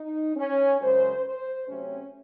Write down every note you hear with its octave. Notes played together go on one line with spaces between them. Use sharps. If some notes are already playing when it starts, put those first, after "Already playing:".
Already playing: D#4
C#4
F#2 C#3 G#3 C5
C5
C3 F#3 A3 C4 C#4